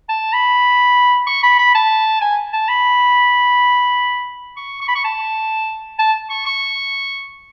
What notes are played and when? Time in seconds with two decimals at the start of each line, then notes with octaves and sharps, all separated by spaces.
0.09 A5
0.33 B5
1.27 C#6
1.43 B5
1.58 B5
1.75 A5
2.21 G#5
2.53 A5
2.68 B5
4.57 C#6
4.81 C#6
4.88 B5
4.95 C#6
5.04 A5
5.99 A5
6.30 C#6
6.46 C#6